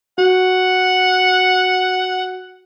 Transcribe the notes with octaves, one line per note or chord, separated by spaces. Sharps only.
F#4 F#5